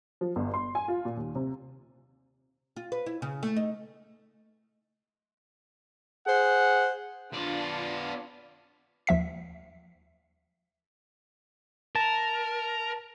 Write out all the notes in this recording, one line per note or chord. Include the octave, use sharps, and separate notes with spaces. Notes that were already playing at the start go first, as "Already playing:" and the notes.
F3
G1
C6
G#5
F4
A#2
D#2
C3
F4
B4
E4
C#3
A3
D#4
G#4 C5 F#5
B3 D4 F4 D5
D#2 F3 E5 B6
A#4 A5